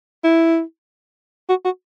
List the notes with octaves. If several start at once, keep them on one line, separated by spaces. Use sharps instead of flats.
E4
F#4
F#4